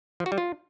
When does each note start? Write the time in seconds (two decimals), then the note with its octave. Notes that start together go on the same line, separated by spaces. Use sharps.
0.20 F3
0.26 F#4
0.32 G3
0.38 F4